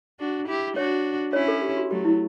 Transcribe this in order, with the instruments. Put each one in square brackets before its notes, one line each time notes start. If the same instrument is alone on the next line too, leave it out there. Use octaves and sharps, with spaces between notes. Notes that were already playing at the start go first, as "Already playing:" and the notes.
[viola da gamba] D4 F#4
E4 G4
[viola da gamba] D4 F#4 [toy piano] C#5
[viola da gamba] C#4 E4 [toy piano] C#5
[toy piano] A4
G4
F#4
[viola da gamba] F#3 A3 [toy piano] G4
[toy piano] E4